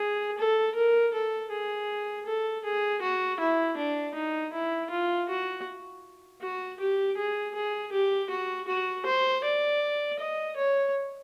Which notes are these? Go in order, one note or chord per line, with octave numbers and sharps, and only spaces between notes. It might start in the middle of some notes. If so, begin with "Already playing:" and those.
Already playing: G#4
A4
A#4
A4
G#4
A4
G#4
F#4
E4
D4
D#4
E4
F4
F#4
F#4
G4
G#4
G#4
G4
F#4
F#4
C5
D5
D#5
C#5